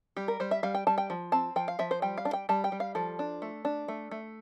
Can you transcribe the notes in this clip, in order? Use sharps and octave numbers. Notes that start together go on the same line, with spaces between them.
G3 G4
A#4
G3 C5
E5
G3 F5
G5
G3 A5
G5
F3
C4 A5
F3 G5
F5
F3 E5
C5
G3 G5
F5
D4
G5
G3 A5
G5
G3
F5
F3 A4
D4
A3
D4
A3
A3